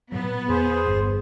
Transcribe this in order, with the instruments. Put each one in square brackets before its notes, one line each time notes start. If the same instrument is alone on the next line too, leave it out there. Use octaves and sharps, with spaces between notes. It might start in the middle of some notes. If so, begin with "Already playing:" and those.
[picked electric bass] A#2 F#3 [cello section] B3
[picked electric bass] E2 [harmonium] G#4 C5
[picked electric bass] G1